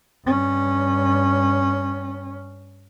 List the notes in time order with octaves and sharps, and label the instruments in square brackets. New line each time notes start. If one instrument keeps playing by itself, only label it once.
[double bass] G2 C#4